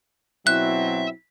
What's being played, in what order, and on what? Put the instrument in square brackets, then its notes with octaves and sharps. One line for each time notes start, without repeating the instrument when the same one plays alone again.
[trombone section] B2 F#3 C4 [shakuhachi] E4 [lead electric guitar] E5 [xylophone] F#6